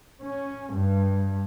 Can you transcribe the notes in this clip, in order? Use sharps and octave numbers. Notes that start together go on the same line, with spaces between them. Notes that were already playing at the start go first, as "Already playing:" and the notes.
C#4
G2